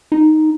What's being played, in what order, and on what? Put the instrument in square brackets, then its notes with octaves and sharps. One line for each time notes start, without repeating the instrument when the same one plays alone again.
[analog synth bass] D#4